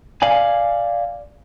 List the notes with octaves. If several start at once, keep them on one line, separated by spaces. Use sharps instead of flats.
D5 F5 G#5